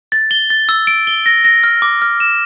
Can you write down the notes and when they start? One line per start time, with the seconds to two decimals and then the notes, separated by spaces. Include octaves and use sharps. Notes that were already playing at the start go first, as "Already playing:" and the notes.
0.12 A6
0.31 G7
0.50 A6
0.69 E6
0.87 D7
1.07 G7
1.26 A#6
1.45 A#6
1.64 F6
1.82 D6
2.02 F6
2.20 E7